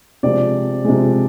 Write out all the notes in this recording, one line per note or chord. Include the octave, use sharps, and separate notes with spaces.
C3 F3 G#3 D5
C3 F3 G#3